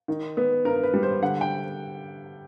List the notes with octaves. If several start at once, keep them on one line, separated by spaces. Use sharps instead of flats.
D#3
B3
G2 A#4
B4
G3
C5
D3 F#5
G5